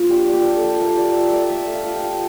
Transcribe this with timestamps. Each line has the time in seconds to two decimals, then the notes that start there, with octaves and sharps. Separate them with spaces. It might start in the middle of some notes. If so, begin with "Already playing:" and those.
Already playing: F3 A#3 F4
0.10 D4 G4
0.28 D4
0.33 G4
0.45 A#3
0.57 A4
0.63 F3
0.80 A3 A#4
0.97 F4 D5
1.15 F4 E5
1.32 A3 D5
1.49 A3 E5
1.67 A3
1.73 F5
1.84 F4
1.96 G5
2.02 F4